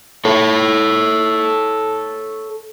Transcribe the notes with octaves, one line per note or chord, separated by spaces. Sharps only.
A4 C#5